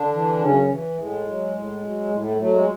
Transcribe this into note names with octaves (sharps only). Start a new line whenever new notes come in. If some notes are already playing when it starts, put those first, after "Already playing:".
Already playing: D3 D4
E3
F#2 C#3 C#4
E3
A2 G#3
F#3
A2
F#3
A2
A3
F#3 A3
G#3